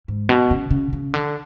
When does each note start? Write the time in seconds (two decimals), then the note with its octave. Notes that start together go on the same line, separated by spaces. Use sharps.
0.08 G#2
0.29 B2
0.51 C#3
0.71 C#3
0.93 C#3
1.14 D3